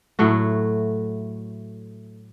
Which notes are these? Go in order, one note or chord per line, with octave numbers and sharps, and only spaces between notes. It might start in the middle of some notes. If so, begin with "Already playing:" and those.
A2 F#3 A3 F#4